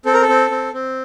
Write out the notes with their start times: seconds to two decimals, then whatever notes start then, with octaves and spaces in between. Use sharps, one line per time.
0.06 C4 A4
0.13 A#4
0.21 A4
0.28 C4
0.51 C4
0.73 C4